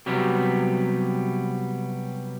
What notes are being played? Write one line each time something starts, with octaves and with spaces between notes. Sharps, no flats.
C3 F#3 G3 B3